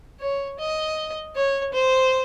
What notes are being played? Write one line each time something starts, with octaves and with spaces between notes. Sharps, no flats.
C#5
D#5
C#5
C5